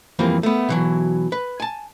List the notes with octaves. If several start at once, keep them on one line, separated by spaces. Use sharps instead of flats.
F2 E3 G3 A#3 C4
A3 B3
B2 E3 F#3
B4
G#5 A5